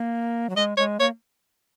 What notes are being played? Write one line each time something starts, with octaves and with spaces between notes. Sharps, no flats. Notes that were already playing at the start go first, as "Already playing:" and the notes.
Already playing: A#3
F#3
G#3 D#5
G#3 C#5
A#3 C#5